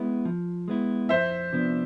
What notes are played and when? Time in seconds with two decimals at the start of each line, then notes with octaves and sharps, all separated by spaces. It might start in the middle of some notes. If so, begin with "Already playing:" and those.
Already playing: G#3 B3 E4
0.25 F3
0.68 G#3 B3 E4
1.09 F2 C5 E5
1.52 C3 F3 B3 D4